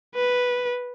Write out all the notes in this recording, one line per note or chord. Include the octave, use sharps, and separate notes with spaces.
B4